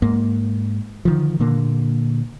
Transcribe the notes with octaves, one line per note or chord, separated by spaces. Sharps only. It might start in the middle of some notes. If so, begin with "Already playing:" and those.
G#2 A#3
D3 D#3 F3
A#2 D3 A#3